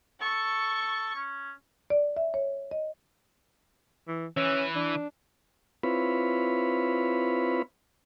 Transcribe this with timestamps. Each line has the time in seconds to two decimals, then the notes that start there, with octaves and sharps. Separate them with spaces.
0.22 A4 C#6
1.16 C#4
1.90 D5
2.16 E5
2.34 C#5
2.71 D#5
4.08 E3
4.37 E3 C#4
4.76 D4
5.83 C4 E4 F4 B4 C#5 B5